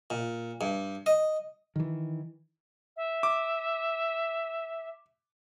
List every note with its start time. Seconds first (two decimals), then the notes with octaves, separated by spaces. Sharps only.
0.10 A#2
0.61 G2
1.06 D#5
1.76 D#3 E3
2.96 E5
3.23 D6